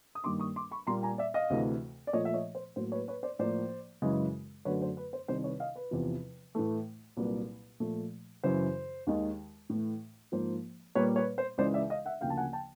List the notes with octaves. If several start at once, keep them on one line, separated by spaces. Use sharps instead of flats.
D#6
G2 D#3 G3 A#3 C6 D6
C#6 D#6
C6 D6
B5 C#6
A#2 G3 A#3 A#5 C6
G#5 A#5
D5 E5
D#5 F5
D2 C3 E3 A3
D5
A#2 F3 A3 C#5 D#5
E5
C#5 D#5
C5
A2 F#3 A#3 C5
B4 C#5
B4 C#5
C5 D5
A2 F3 A#3 C5 D5
F#2 C#3 E3 G#3
F#2 D3 F#3 A3 B4 C#5
C5
B4
C5
C2 C3 D#3 C5
B4 C#5
D#5 F5
B4
E2 C3 F3
A2 E3 A3
C2 A#2 F#3 A#3 B4
A#2 F3 A3
F#2 C#3 E3 C5
D#2 D#3 G#3
A2 E3 A3
G#2 F3 A#3 C5
A#2 G3 A#3 B4 C#5
B4 C#5
C5
C#2 C#3 E3 G#3 C5 D5
D5 E5
D#5 F5
E5 F#5
D2 C#3 F3 A#3 F5 G5
A5
F#5 G#5
G5 A5